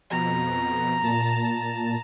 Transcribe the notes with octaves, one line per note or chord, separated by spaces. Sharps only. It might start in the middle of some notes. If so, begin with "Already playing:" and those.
F2 B2 A#5
A#2 A5